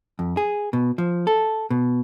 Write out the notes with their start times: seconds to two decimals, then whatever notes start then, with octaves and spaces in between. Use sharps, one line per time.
0.19 F2
0.37 G#4
0.73 B2
0.98 F3
1.27 A4
1.70 B2